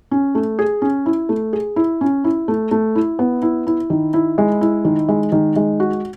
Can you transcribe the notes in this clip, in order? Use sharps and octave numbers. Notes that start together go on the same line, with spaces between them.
C#4
A3
G#4
C#4
E4
A3
G#4
E4
C#4
E4
A3
A3
E4
B3
E4
E4
D#3
E4
G#3
E4
D#3
G#3
D#3
G#3
F#4